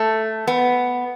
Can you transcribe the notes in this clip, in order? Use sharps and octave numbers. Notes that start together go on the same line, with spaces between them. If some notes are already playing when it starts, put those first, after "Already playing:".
Already playing: A3
B3